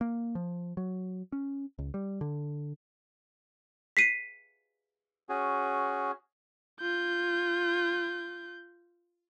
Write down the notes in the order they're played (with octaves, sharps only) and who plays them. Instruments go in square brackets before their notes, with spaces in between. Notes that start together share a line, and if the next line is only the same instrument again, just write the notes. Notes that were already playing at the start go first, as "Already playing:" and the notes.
[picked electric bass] A#3
F3
F#3
C#4
C#2
G3
D3
[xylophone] B6 C7 D#7
[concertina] C#4 F#4 G#4
[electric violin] F4 G6